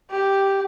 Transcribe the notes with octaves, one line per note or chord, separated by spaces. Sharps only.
G4